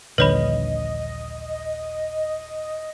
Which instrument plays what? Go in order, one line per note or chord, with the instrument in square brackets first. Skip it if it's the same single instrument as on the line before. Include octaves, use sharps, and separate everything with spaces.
[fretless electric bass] D#1 A#1 D3 [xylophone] B4 C#5 B5 [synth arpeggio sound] D#5